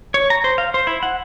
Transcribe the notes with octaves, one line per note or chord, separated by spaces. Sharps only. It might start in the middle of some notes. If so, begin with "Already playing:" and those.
C#5
A#5
C5
F5
C5
E4
F#5